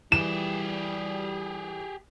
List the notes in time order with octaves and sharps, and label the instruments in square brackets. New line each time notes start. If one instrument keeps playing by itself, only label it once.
[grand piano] E3 [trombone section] G3 [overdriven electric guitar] G4 G#4 [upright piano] E7